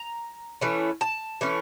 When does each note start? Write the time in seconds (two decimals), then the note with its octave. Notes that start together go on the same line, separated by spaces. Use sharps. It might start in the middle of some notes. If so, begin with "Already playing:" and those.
Already playing: A#5
0.61 E3 A3 C#4
1.01 A5
1.41 E3 A3 C#4